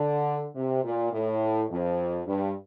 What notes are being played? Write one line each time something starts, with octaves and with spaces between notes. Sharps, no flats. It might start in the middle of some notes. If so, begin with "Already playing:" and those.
Already playing: D3
C3
A#2
A2
F2
G2